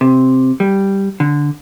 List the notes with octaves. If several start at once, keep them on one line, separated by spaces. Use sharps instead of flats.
C3
G3
D3